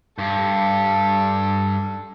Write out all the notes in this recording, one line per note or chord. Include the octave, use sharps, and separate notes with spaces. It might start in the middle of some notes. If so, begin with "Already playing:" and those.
G2 A4